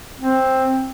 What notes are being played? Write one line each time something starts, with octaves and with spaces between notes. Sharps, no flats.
C4